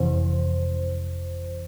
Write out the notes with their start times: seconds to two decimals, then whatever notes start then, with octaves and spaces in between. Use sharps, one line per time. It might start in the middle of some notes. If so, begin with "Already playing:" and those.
Already playing: G1 F2 C3 E3 C5